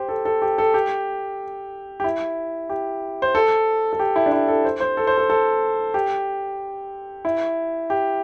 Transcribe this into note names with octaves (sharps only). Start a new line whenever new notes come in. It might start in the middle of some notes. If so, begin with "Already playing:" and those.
Already playing: G4 C5
A4
A4
G4
A4
G4
G4
E4
G4
C5
A4
A4
G4
E4
D4
E4
A4
C5
C5
A4
C5
A4
A4
G4
E4
G4